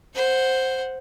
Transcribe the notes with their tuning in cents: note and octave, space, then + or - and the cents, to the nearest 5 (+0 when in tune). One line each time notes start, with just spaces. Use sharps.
C5 +0 F#5 +0